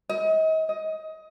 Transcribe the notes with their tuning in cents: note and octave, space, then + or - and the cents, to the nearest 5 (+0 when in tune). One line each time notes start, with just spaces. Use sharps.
D#5 +35
D#5 +20